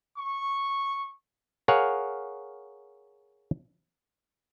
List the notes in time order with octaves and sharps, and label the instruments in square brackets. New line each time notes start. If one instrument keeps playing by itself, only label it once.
[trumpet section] C#6
[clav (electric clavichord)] G#4 A#4 C#5 F5 F#5